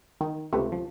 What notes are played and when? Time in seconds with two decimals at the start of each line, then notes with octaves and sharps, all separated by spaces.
0.21 D#3
0.53 C#2 C3 A3 B4
0.72 F3